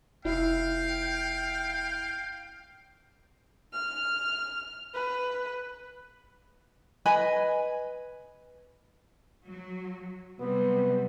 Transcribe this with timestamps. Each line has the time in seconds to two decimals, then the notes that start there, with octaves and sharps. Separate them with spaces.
0.25 F1 E4 F5 G5
3.73 F6
4.94 B4
7.06 B4 D#5 G#5 B5
9.48 F#3
10.40 C3 F#3 G3 B3